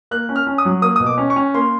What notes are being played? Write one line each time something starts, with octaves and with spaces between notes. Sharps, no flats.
A#3 F#6
C#4
F6
C#4
D#6
F#3
A#3 D#6
B2 D#6
D6
C#4
C#6
C#4
A#3 C6